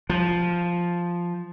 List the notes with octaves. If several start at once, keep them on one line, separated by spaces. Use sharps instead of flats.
F3